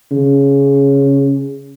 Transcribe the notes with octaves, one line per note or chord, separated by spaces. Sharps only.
C#3